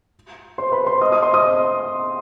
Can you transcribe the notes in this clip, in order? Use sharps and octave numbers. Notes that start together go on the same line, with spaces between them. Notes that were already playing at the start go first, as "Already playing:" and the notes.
C5 C6
B4 B5
C5 C6
D#5 D#6
D#5 D#6
C5 C6
D#5 D#6